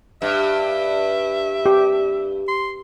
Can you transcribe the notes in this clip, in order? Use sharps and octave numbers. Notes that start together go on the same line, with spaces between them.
G2 E5
G4
C6